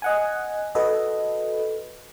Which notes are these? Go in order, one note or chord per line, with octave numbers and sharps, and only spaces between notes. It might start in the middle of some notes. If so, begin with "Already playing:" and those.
D#5 F#5 G#5
F#4 A4 B4 D#5